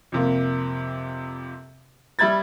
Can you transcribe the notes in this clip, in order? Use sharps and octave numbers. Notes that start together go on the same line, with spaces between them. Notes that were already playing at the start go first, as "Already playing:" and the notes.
F2 C3 A#3
G3 E5 B5 G#6 A6